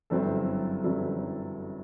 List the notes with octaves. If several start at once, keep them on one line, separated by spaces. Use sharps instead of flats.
G1 F#2 F#3 C4 E4 A4
G1 F#2 F#3 C4 E4 A4